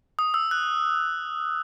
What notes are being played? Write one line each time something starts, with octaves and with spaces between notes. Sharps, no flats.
D#6
E6
F#6